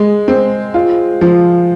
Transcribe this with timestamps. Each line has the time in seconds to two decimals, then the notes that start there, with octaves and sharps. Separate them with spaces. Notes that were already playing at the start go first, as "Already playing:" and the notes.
Already playing: G#3
0.28 C4
0.74 F4
1.21 F3